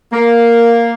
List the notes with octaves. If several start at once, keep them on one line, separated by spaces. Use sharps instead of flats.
A#3